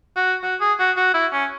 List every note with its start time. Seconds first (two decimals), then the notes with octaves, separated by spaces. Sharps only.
0.16 F#4
0.43 F#4
0.60 G#4
0.79 F#4
0.97 F#4
1.14 E4
1.32 C#4